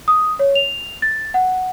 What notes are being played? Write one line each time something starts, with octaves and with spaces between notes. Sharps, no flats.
D#6
C#5
F7
A6
F#5